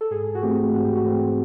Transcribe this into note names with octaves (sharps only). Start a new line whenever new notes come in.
A4
G#2 G#4
F#4
E3 A3 C4 G4
G#2 F#4
G4
F#4
E3 A3 C4